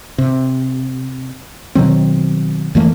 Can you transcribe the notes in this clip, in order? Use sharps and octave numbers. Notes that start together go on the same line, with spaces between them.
C3
B2 D#3 F#3 C4
F2 E3 A3 A#3